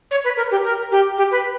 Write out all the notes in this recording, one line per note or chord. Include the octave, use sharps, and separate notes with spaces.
C#5
B4
A#4
G4
A#4
G4
G4
B4